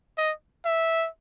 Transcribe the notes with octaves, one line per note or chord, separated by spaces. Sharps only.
D#5
E5